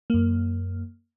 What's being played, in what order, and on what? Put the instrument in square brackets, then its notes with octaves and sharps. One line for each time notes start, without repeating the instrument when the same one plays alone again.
[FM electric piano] F#2 A#3